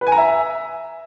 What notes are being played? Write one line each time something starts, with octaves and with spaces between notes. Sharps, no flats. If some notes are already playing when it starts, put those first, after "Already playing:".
B4
G#5
A#5
E5